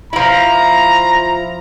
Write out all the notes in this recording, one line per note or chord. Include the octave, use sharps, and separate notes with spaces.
F3 E4 A#5